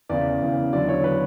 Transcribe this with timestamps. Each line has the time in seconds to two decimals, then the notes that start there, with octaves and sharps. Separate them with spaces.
0.09 E2 C#3 E3 D5
0.42 E2 C#3 E3
0.72 E2 D3 F#3 D5
0.89 C#5
1.04 D3 F#3 B4